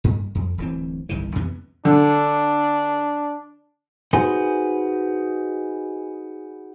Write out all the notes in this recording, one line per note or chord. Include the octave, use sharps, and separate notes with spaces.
G2
F2
D1 E3 C4
G1 C2 D#3 E3
F2 C3 E3 B3
D3 D4
D#4 F#4 G#4 B4 C5